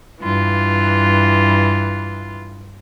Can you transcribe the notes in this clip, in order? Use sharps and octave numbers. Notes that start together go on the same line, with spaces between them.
G2 E3 F4